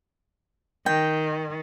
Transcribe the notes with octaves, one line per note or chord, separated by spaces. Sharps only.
D#3 G5